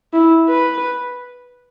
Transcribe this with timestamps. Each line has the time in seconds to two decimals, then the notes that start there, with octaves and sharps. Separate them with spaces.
0.13 E4
0.49 B4